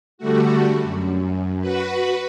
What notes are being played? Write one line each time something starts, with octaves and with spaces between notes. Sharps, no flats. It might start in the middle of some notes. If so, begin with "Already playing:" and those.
D3 G3 A3 F#4
F#2
F#4 B4